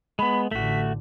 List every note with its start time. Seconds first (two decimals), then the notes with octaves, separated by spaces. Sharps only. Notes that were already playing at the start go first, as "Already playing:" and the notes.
0.19 G#3 B3 B5
0.51 A1 D3 A3 F#4 B6